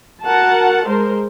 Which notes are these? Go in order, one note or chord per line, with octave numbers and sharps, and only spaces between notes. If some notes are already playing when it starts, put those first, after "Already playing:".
F#4 A#4 F#5 A5
G#3 A#4 C5